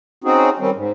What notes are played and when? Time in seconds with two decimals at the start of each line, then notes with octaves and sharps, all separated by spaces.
0.24 C4 C#4 D#4 F#4 G#4
0.59 D#3 G3 C4 C#4
0.75 G#2